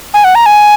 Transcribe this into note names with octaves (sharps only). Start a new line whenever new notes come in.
G#5
F#5
A#5
G#5